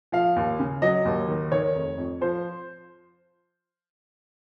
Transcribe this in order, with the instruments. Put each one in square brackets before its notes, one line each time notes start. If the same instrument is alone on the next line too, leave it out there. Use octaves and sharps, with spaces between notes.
[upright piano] F3 F5
D#2
C#3
F#3 D#5
D#2
D#3
D#3 C#5
F1
F2
F3 C5